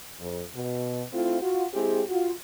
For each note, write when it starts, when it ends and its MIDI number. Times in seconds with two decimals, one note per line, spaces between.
0.20 0.42 41
0.54 1.02 47
1.12 1.37 57
1.12 1.37 60
1.12 1.37 64
1.12 1.37 65
1.42 1.65 65
1.42 1.65 66
1.73 2.02 56
1.73 2.02 60
1.73 2.02 64
1.73 2.02 67
1.73 2.02 68
2.09 2.32 65
2.09 2.32 66